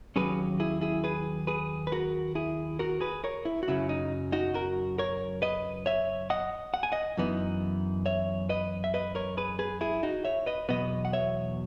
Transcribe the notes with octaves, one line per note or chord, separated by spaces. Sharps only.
D#2 C#3 F#3 C#4 G#4 B4
E4 G#4
E4 G#4
G#4 B4
G#4 B4
B4
F#4 A#4
E4 G#4
F#4 A#4
G#4 B4
A#4 C#5
E4
F#4
F#2 C#3 F#3 E4
D#4
D#4 F#4
F#4 A#4
A#4 C#5
B4 D#5
C#5 E5
D#5 F#5
F#5
G#5
D#5 F#5
F#2 E3 B3 D#4
C#5 E5
B4 D#5
E5
B4 D#5
A#4 C#5
G#4 B4
G#4 B4
E4 G#4
D#4 F#4
C#5 E5
B4 D#5
E2 B2 F#3 B3 B4 D#5
F#5
C#5 E5